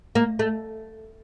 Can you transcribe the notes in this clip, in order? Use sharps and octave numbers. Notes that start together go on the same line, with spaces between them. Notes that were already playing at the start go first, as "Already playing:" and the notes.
A#3
A3